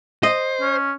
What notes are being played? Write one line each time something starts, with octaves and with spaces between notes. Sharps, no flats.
C5 D#5
C#4